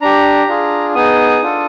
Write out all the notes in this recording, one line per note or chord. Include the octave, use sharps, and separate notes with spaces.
D4 G4 A#5
D4 F4 G#4
B3 D#4 G#4 D#6
D4 F4 A4